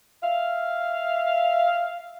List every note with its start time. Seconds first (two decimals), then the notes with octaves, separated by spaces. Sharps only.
0.22 E5 F5